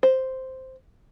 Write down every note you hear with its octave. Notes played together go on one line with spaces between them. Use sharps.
C5